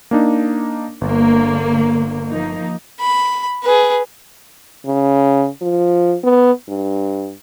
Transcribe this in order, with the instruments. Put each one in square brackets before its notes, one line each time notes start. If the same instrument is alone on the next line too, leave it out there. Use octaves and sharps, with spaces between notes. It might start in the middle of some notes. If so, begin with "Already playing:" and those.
[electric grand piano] A#3 D4 D#4
[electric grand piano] G1 [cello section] D3 A#3
[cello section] F3 A#3 D#4
[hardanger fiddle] B5
G#4 B4
[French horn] C#3
F3
B3
G2